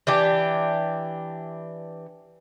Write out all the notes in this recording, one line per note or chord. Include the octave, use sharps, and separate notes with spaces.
E3 D4 G4